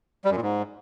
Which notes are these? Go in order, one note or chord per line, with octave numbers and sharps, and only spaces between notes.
G3
F#2
A#2
G#2